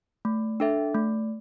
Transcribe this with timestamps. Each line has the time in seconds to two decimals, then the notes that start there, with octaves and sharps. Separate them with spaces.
0.25 A3
0.60 D4 A4 E5
0.95 A3